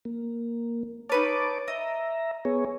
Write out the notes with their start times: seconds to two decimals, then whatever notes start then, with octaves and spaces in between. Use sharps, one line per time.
0.05 A#3
1.10 D#4 B4 C#5 A5 D6 F6
1.68 D#5 E5 A#5
2.45 B3 G#4 C#5